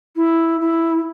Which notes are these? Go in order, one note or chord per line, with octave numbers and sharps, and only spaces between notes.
E4
E4